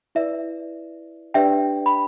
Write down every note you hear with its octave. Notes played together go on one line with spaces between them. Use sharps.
E4 B4 D5 E5
D4 G4 B4 D5 E5 G5
B5